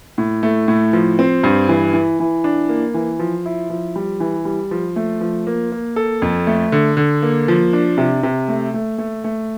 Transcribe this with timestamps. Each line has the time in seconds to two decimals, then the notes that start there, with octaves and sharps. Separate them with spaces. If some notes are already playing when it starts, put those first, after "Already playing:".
0.18 A2
0.43 A3
0.68 A2
0.93 F3
1.19 C4
1.44 G2
1.68 E3
1.93 E3
2.20 E3
2.44 D4
2.69 A#3
2.94 E3
3.19 F3
3.46 E4
3.70 F3
3.96 G3
4.20 E3
4.45 G3
4.71 F3
4.96 A3
5.21 F3
5.47 A#3
5.72 A#3
5.96 A4
6.22 F2
6.47 A3
6.72 D3
6.97 D3
7.22 A#3
7.48 F3
7.73 D4
7.98 C3
8.23 C3
8.48 A3
8.74 A3
8.98 A3
9.24 A3